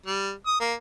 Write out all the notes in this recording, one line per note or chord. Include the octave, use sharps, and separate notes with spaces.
G3
D#6
A#3